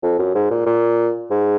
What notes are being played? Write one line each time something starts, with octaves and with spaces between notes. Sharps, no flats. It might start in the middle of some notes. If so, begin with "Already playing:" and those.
F2
F#2
G#2
A#2
A#2
G#2